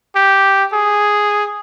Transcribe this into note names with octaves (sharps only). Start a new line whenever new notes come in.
G4
G#4